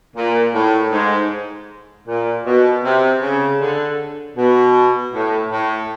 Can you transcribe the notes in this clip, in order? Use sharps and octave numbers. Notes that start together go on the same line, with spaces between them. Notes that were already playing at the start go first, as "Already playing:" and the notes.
A#2
A2
G#2
A#2
B2
C3
C#3
D3
B2
A2
A2